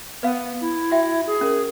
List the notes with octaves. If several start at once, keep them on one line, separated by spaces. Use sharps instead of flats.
B3 B4 F5
E4
F#4 E5 G5
G#4
C#4 A#4